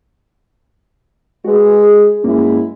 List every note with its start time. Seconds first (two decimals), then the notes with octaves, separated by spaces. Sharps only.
1.45 G#3 F#4 B4
1.84 G#4
2.24 G2 F#3 G#3 A#3 C#4 E4